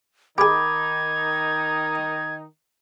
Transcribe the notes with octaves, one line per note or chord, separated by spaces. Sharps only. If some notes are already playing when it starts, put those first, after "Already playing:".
D#3 D#4 G4 G#4 B5 D6 G#6